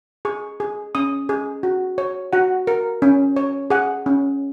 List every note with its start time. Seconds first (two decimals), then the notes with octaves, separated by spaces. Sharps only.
0.25 G#4 C#6
0.60 G#4
0.95 C#4 D#6
1.29 G#4
1.63 F#4
1.98 C#5
2.33 F#4 F#5
2.67 A#4
3.02 C#4
3.36 C#5
3.70 G#4 F#5
4.06 C#4